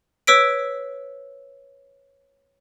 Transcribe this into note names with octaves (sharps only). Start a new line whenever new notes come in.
B4 C#5 E6 B6 D7